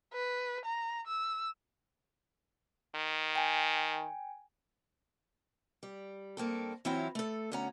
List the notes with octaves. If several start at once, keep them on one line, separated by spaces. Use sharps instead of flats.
B4
A#5
E6
D#3
G5 G#5
G3
G2 A#3 C4 A4
E3 F#3 C4 E4 F4 C#5
A3 A4
D2 B3 C#4 F#5 A#5